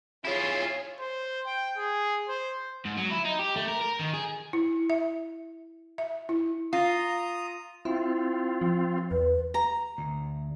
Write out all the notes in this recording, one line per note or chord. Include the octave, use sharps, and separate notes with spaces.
E4 F4 G#4 C#5
C5
G5
G#4
C5
G#2
F#3
E4
D#4
G4
A3
A#4
A#4
D#3
G#4
E4
E5
E5
E4
F4 A#5 D#6
C4 E4 F4
F3
E2 B4
A#5
D2